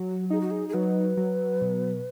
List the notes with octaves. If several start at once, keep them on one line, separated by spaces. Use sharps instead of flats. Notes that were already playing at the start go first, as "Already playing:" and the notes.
Already playing: F#3
F#4
D#4 G#4
F#4
G#4
G#4
F#3 B4
F#3
B2